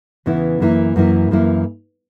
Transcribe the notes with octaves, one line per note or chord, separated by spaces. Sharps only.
E2 C#3 E3 B3 E4
F#2 E3 A#3 E4
F#2 E3 A#3 E4
F#2 E3 A#3 E4